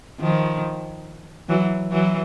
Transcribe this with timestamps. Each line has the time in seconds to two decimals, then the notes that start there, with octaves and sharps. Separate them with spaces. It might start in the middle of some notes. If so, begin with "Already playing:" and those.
0.20 D#3 F3
1.49 E3 F#3
1.91 E3 F#3